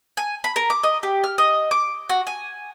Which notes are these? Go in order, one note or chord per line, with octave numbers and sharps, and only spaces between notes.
G#5
B5
A#4
D6
D#5
G4
F6
D#5
D6
F#4
G#5